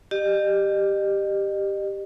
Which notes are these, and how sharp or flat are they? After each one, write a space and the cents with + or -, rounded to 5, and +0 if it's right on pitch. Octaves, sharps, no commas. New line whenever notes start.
G4 +0 D#5 -40